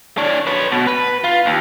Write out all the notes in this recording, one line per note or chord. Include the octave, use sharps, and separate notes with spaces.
D4 C#5
B4 C#5
B2
B4
F4
D#2